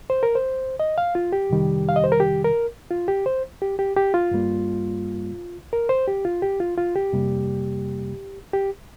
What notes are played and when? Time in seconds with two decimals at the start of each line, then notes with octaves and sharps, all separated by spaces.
0.10 C5
0.23 A#4
0.35 C5
0.80 D#5
0.98 F5
1.15 F4
1.32 G4
1.50 F2 C3 D#3 G3
1.89 F5
1.96 D#5
2.04 C5
2.12 A#4
2.20 G4
2.45 A#4
2.91 F4
3.08 G4
3.26 C5
3.62 G4
3.79 G4
3.96 G4
4.14 F4
4.31 G2 G3 A#3
5.73 A#4
5.89 C5
6.08 G4
6.25 F4
6.42 G4
6.60 F4
6.78 F4
6.96 G4
7.13 F2 C3 G3 A#3
8.53 G4